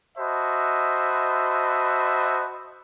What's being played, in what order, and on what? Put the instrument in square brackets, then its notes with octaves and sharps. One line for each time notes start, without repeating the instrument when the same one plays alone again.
[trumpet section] F#4 C5 D#5 E5 A5 B5